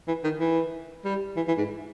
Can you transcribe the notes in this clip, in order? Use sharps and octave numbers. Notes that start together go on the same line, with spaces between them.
E3
D#3
E3
G3
E3
E3
G#2